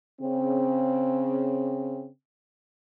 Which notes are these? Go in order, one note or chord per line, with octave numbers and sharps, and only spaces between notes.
C#3 C4